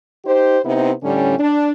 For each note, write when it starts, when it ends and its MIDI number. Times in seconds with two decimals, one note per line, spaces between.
0.25 0.57 63
0.25 0.57 67
0.25 0.57 72
0.64 0.91 48
0.64 0.91 59
0.64 0.91 60
0.64 0.91 63
0.64 0.91 64
1.02 1.36 45
1.02 1.36 50
1.02 1.36 55
1.02 1.36 61
1.38 1.72 62